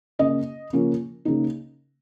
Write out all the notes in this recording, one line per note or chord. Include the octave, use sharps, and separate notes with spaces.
C#3 A#3 C#4 D#5
C#3 F3 A#3 C#4
C#3 A#3 D#4